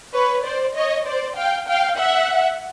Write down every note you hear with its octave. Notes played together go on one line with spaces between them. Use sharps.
B4 C#5
C5 D5
C#5 D#5
C5 D5
F5 G5
F5 G5
E5 F#5